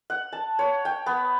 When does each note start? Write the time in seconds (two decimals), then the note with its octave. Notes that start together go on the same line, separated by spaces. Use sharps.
0.10 F#5
0.33 A5
0.59 C#5
0.85 G5
1.06 B3